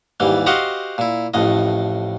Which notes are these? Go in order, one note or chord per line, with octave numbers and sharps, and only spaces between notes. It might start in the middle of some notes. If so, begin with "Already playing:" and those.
D#2 G#2 E3 G3
F#4 G4 C5 D#5 F5 F#5
A#2 E4
A1 F2 A2 D#5